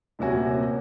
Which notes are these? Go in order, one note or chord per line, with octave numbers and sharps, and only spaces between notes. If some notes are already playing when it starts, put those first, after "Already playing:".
D#1 C3 C#4 F#4 G#5